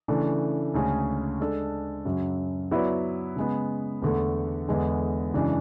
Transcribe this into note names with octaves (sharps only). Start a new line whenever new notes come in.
C#3 E3 A3 D4
D2 C#3 G#3 C#4 G#4
G#3 D4 A4
F#2 C#3 F#3
F#3 B3 E4 B4 D5
C#3 G#3 B3
E2 D3 A3
E2 D3 G#3 B3
F#2 C#3 E3 G#3 D4